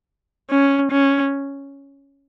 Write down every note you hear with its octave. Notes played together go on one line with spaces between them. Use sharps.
C#4
C#4